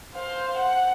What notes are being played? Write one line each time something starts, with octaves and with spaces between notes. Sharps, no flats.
C5 F5
F#5